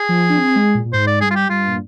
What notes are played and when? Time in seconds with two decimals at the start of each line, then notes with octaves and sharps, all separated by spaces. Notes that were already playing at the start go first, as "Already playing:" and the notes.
Already playing: G#4
0.09 F3
0.30 D4
0.37 C4
0.56 G#3
0.75 A#2
0.85 A#2
0.93 G#2 C5
1.07 D5
1.21 G2 G#4
1.31 F4
1.35 G4
1.50 G2 F4
1.67 A#2